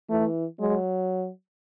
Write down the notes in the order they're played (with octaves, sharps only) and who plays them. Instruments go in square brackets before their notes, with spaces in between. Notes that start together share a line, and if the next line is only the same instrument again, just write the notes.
[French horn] E3 [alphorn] A3
[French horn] F#3 [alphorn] G#3